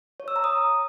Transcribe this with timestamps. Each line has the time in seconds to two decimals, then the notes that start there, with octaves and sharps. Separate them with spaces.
0.20 C#5
0.28 E6
0.36 A#5
0.44 D#6